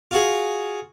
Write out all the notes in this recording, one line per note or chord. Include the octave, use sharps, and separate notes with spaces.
F4 F#4 G#4